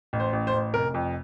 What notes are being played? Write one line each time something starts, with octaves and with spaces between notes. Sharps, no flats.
A1
C5
A1
C5
A1
F1 A#4
F2